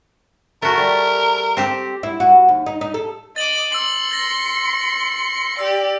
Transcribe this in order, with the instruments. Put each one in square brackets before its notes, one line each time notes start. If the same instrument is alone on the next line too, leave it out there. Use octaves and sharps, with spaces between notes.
[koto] A3 F#4 [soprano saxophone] A#4
[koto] G3
C4 G4 C5
[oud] E4
F#4
D#2
D#4
D#4
A4
[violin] D#5 D6 [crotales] A6 F#7
[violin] C6 C#7 [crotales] E6 F#7
[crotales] A6 A#6
[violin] G4 D5 [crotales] E6